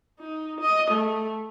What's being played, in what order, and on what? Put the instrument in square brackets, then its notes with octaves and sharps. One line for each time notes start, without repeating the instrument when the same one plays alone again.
[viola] D#4
D#5
A3